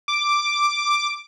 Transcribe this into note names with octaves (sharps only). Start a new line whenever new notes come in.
D6